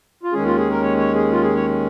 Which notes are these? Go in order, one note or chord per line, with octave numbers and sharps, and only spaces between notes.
F4
D#2 D#3 G#3 C#4 G#4
F4
G#4
A#4
C#5
C#5
G#4
F4
G#4
C#5